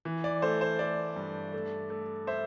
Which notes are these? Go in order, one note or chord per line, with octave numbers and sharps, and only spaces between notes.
E3
D5
A3 C5
C5
A3 D5
G2
A3
A3
C5 E5